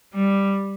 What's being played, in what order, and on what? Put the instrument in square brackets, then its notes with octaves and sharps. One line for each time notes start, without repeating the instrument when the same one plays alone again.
[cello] G3